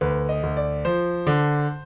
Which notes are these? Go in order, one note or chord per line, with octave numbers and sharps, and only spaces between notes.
D2 B4
D#5
D2
D5
F3 C5
D3